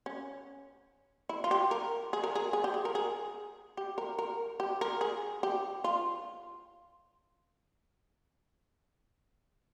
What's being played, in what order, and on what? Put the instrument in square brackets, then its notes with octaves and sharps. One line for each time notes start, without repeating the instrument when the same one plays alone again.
[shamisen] C#4
E4
F4
G4
A#4
G#4
A#4
G#4
G#4
G4
G#4
A#4
G#4
G4
A#4
A#4
G4
A#4
G#4
G4
F4